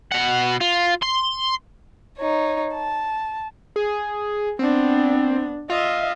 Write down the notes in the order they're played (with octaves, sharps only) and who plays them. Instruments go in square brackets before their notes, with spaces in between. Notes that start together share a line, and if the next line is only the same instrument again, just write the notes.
[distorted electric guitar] B2 F#5
F4
C6
[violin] D#4 C#5
A5
[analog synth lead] G#4
[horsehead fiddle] B3 D4 [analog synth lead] C4
[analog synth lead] F4 [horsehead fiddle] D#5 E5